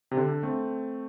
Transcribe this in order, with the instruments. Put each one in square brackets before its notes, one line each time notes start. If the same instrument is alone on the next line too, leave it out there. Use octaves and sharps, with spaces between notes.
[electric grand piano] C3
D3
A3 C4